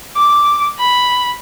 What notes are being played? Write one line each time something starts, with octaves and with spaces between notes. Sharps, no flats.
D6
B5